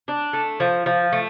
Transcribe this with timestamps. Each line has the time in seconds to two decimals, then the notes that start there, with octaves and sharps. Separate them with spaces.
0.08 D4
0.33 A3
0.60 F3
0.86 F3
1.12 A3